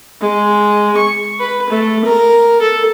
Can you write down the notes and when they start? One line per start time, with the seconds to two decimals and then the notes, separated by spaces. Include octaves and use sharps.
0.21 G#3
0.97 C#6
1.40 B4
1.70 A3
2.05 A#4
2.62 A4